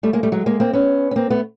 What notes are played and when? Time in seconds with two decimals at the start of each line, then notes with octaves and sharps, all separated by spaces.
0.03 G3 A3
0.13 G#3 A#3
0.23 G3 A3
0.32 F#3 G#3
0.46 G#3 A#3
0.60 A#3 C4
0.73 B3 C#4
1.11 C#4
1.16 A#3 C4
1.30 A3 B3